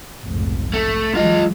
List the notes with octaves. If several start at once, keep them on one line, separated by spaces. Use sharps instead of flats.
F1 B1 G#2
A3
E3 F#3 G#3 F4 D#5